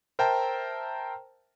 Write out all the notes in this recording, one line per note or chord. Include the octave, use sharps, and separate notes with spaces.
A#4 C5 E5 G5 A5 A#5